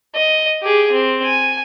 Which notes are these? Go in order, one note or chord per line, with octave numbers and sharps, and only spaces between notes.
D#5
G4 G#4
C4
G#5